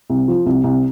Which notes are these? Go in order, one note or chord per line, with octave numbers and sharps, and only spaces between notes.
C2
F3
C2
C2